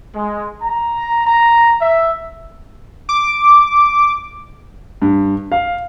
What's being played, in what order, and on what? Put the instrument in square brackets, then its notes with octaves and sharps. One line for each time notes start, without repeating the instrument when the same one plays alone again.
[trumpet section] G#3
A#5
A#5
E5
[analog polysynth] D6
[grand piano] G2
F5